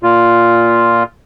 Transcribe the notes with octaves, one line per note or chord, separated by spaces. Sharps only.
A#2 F4